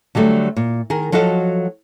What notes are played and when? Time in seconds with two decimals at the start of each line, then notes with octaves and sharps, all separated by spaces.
0.15 D3 F#3 G3 A3
0.57 A#2
0.90 D#3 G#4 A#4
1.12 F3 F#3 F#4 A4 D#5